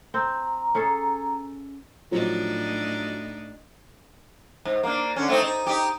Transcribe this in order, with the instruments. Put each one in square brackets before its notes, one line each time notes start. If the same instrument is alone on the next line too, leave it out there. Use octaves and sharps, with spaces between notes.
[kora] C4 [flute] A#5
[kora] C#4 G#4 A4
[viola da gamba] A2 D4 D#4 [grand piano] F3 F#3
[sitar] G#2
A#3 D4
D3 C#4
A3 C4 D#4
D#4
D#4 G4